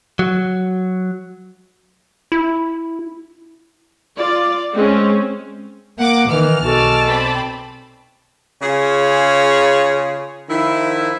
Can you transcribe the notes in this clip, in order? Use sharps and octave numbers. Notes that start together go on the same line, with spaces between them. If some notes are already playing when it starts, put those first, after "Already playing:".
F#3
E4
F4 D5
G#3 C4 C#4
A#3 F#5 D6
D#3 E3 F6
B1 G#3 F#4 A4 D5 A5
C4 B5
C#3 F4 G#4 C#5 G#5
D#3 F3 E4